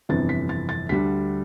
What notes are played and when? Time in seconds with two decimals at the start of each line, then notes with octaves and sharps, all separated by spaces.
0.09 G1 F2 C3 E3 A6
0.29 B6
0.49 A6
0.69 A6
0.89 D2 D3 G3 D4 B6